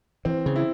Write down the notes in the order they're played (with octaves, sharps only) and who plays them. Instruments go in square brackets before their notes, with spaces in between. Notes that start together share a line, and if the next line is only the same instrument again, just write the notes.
[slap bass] E3 [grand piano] C4
[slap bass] C#3
[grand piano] E4